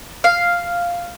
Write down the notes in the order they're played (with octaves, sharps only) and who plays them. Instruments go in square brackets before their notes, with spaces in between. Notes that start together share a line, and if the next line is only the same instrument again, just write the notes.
[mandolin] F5